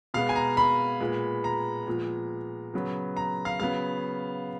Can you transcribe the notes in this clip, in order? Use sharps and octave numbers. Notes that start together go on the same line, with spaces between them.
B2 G#3 B3 F5
G#5
A#5
B5
A#2 G#3 B3
A#5
A#2 F3 G#3 B3
C#3 F#3 B3
A#5
F5
C#3 F#3 B3 F5